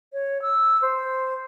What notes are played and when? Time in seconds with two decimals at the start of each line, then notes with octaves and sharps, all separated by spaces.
0.13 C#5
0.42 E6
0.82 C5